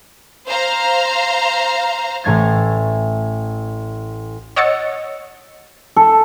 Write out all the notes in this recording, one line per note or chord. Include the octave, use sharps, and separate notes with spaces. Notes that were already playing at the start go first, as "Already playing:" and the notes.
C5 F5 A#5
A1 A2 A3 G#6 A6
C#5 D#5 F#5 E6 A6 C#7
A4